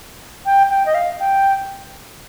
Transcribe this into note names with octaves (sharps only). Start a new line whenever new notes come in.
G5
G5
D#5
F5
G5